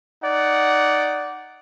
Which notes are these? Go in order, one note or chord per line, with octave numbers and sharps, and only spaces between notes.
D#4 D5 F#5